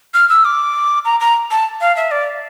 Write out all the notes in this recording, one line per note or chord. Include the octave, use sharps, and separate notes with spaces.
F6
E6
D6
A#5
A#5
A5
F5
E5
D5